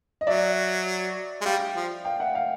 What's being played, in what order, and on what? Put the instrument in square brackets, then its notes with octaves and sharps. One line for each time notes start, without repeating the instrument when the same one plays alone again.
[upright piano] D#5
[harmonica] F#3 [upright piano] D5 E5
[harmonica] G#3
[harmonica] G3 [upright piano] F5 G5
[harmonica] F3
[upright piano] F5 G5
E5 F#5
F5 G5